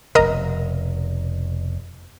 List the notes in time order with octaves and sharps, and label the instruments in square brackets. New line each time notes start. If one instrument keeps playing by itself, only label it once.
[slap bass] F1 B2 [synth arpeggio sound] A#4 D#5 A#5